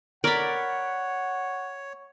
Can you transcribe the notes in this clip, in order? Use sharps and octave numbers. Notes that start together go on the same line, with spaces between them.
A#4 C#5 D5 F#5 B5